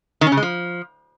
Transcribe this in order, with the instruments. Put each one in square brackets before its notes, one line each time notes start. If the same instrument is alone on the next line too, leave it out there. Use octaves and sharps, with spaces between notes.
[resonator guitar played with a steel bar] D#3
C#4
C#3
G#3
F3